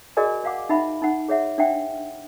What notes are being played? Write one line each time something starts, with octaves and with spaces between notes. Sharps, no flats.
F#4 G#4 A#4 D5 D#5 G#5
D5 F5 F#5 D6
D#4 E5 F#5 B5
D#4 F#5
G#4 C#5 E5 F#5
D4 E5 F#5 G5